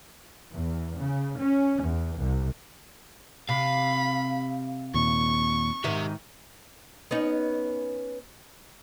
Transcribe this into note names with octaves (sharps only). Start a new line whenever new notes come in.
E2
C#3
C#4
E2
C2
C3 F5 B5
D#2 A#2 C#6
G#2 D#3 G4 E5
B3 C#4 D#4